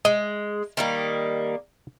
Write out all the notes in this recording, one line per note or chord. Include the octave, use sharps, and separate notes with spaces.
G#3 D#5
D#3 G3 A#3